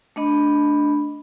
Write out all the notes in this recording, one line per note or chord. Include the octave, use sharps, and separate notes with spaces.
A3 D4 D#5 B5